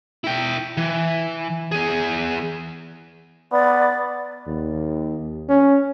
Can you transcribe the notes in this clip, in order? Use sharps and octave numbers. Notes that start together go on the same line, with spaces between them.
E4 G5
E3
E2 G#4
B3 D5
D#2
C#4